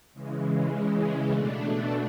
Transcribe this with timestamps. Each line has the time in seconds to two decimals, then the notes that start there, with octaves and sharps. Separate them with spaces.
0.14 C#3 E3 G#3
1.30 B2 A3 D4